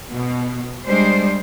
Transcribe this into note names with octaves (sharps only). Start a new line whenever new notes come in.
B2
G3 G#3 D4 C5